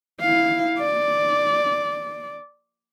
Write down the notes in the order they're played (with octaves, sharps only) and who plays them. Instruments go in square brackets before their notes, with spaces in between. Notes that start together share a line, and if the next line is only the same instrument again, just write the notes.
[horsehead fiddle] E4 F5
D5